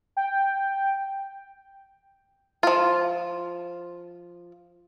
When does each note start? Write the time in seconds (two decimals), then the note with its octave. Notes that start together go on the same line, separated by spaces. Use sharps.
0.17 G5
2.63 F3 F4